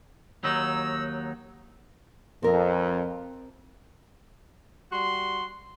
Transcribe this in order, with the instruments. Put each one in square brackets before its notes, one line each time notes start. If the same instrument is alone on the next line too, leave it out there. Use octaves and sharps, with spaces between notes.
[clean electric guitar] D#2 F#3 D#4 [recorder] E6
[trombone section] F2 [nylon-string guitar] C4 A#4
[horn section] G3 F#4 C6